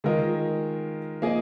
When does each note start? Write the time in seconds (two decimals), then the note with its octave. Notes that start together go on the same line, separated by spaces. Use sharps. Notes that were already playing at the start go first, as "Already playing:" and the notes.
0.04 D#3 G#3 F4 A#4 D#5
1.22 F3 A#3 G#4 D#5